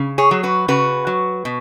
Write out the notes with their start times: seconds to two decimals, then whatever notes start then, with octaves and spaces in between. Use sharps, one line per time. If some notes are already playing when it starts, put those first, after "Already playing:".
Already playing: C#3
0.18 G#4 C#5
0.31 F#3
0.43 F#4 B4
0.68 C#3 F#4 B4
1.07 F#3
1.45 B2